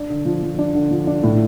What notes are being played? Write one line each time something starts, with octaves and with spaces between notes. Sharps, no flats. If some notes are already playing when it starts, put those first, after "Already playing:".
Already playing: D4
D3
F3
F3
D4
D3
F3
D4
A2